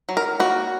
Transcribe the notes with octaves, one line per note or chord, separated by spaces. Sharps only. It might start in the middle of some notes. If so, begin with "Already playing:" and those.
F#3
A#4
A#3 F#4